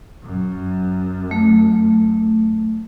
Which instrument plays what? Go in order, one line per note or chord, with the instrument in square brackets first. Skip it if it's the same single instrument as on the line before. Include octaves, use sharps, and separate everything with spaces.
[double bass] F#2
[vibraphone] A3